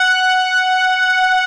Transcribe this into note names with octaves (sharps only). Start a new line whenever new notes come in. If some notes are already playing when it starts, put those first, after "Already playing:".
Already playing: F#5